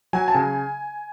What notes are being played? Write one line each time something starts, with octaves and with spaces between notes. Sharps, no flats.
F#3 G#5
A5
C#3 G#5